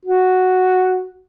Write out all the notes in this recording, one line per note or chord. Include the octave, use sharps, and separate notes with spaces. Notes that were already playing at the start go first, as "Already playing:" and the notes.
F#4